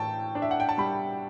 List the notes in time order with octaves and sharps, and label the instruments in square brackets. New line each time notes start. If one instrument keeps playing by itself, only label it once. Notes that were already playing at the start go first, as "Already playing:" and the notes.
Already playing: [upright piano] A2 E3 G5 A5
D4
E5
F#5
G5
A5
G3 B5